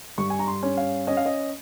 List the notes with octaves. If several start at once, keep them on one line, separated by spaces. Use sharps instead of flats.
G2 C#6
G#5
A#5
C6
C#4
F5
C#4 D#5
F5
D#5